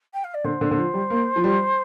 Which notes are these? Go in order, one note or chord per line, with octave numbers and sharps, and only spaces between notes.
G5
F5
D5
D3 C5
D3
D3
F3
G3
A#3
F3
G3